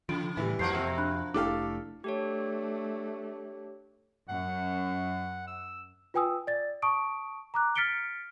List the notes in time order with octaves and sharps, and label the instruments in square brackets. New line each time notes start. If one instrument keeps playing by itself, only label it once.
[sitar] C#3 [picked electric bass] F3 [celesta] D7
[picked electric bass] A2 [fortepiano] E3 G3
[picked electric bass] F2 [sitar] F3 A#3 F#4 [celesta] G6 C7
[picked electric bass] F2 [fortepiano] C3 E6
[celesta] D4 B5 F#6
[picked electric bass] F1 A3 D4 [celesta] E4 D6 [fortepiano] G4 A4 F5
[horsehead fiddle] A3 D4 [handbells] G4 A4 C#5
[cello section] F#2 [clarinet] F#5
[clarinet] E6
[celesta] F4 B4 G5 G#5 D#6 E6
D5 A6
A5 C#6 D#6 D7
A#5 D6 F#6
F6 A6 B6 C#7 D7 G7